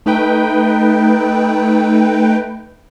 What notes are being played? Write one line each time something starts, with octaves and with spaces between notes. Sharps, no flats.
A3 D#4 B4 G5